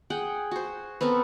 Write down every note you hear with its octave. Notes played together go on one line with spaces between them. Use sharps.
G#4 F#5 G5
F#4 C5
B3 C4 A4 A#4